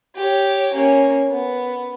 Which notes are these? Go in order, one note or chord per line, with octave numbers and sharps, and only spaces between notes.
G4 C#5
A#3 C#4
B3